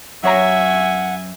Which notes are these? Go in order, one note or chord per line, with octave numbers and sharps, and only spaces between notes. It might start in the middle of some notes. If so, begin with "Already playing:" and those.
F#2 C#5 E5 F#5 G#5 A#5